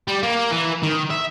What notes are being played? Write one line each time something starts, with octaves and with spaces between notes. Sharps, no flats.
G3
A#3
E3
D#3
E5